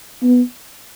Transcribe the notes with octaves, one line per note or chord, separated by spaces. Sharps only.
B3